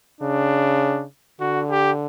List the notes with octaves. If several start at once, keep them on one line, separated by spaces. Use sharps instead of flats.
C#3 D4
D3 F#4
G4